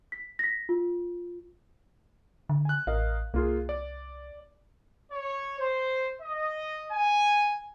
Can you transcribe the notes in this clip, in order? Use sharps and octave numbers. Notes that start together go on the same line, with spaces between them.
B6
A#6 B6
F4
D3
G#5 F#6
A1 A#4 D#5 F5
C2 A#3 F4 G#4
D5
C#5
C5
D#5
G#5